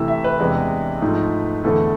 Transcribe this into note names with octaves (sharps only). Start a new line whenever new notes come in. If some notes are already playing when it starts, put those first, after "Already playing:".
Already playing: C3 E3 A3 E4 E6
E5
B4
E2 C3 G#3 D4
G#2 F3 A3
E2 D3 A3 E4 A4